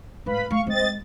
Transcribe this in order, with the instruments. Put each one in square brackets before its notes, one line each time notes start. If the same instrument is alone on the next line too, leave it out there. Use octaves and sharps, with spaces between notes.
[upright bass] G#1 A2 [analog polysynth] B4 F5 B5
[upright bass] A3 [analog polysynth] F5 C#6
[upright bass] G#3 [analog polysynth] C4 D#5 A6